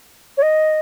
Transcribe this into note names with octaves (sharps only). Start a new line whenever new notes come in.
C#5
D#5